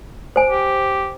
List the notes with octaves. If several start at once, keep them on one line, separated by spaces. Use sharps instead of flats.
C5 G#5
G4